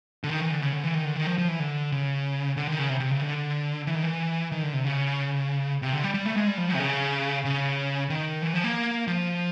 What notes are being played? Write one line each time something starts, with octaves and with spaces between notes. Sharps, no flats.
D3
D#3
E3
D3
C#3
D3
E3
D#3
D3
D#3
F3
F3
E3
D3
C#3
D3
D#3
C#3
C3
C3
C#3
D3
E3
D#3
E3
D#3
D3
C3
C#3
C3
D3
G3
G3
A3
G#3
G3
F3
F#3
C3
C#3
C#3
D#3
E3
F3
A#3
F3